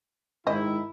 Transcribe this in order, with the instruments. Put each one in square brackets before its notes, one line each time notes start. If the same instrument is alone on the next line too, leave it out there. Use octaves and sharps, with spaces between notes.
[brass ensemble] G#2 D#3 E4 [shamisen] C5 D#5